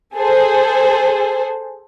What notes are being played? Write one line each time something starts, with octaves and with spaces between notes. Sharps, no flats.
G#4 A4 C5